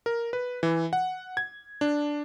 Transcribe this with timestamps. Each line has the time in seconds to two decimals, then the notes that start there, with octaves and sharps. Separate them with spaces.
0.06 A#4
0.33 B4
0.63 E3
0.93 F#5
1.37 G#6
1.81 D4